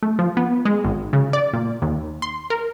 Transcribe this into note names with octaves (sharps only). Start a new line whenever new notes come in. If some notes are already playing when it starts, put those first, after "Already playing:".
A3
F3
B3
G#3
G#1
C#3
D5
A#2
D#2
C6
A#4